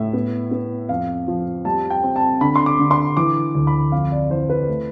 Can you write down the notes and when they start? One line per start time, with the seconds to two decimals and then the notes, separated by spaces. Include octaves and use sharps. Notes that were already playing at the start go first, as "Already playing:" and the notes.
Already playing: A2 E5
0.13 B3
0.51 B3
0.89 F2 F5
1.28 F3
1.65 G3 A5
1.90 G5
2.04 C4
2.16 A5
2.41 D3 B5
2.56 C6
2.66 D6
2.79 D3
2.91 C6
3.17 E3 D6
3.55 D2
3.67 B5
3.92 F2 F5
4.12 D5
4.30 E3 C5
4.50 B4
4.68 A3